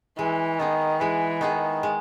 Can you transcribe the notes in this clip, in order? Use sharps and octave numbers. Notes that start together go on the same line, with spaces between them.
E3 G#3
D#3 B3 D#4 G#4
E3 G#3
D#3 B3 D#4 G#4
G#3